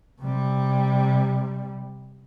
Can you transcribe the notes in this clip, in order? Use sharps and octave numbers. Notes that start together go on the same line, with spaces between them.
C3 G3